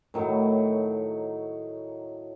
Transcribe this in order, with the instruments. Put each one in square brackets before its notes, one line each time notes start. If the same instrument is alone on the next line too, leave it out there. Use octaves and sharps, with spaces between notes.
[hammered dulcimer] A2 D#3 F#3